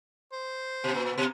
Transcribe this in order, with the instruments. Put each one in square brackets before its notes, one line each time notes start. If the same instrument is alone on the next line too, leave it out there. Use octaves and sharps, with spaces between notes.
[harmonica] C5
[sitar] B2
A#2
B2